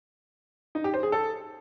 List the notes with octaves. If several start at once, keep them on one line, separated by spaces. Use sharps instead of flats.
D#4
G4
C5
G#4
A4